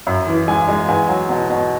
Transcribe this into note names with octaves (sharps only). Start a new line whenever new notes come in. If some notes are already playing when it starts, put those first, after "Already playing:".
F#2
E3
G#3 G#5
G#3
E2 G#5
F#3
B2
B2